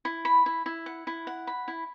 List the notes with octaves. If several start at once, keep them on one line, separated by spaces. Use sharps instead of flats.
E4
B5
E4
E4
F#5
E4
F#5
B5
E4